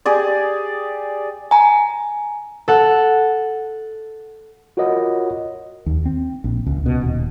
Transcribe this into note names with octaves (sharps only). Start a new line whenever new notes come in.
G4 G#4 D5
G#5 A#5
A4 F#5
F4 F#4 A#4 C#5 D#5 F#5
D#2
C4
A#1
C#2
B2
D#1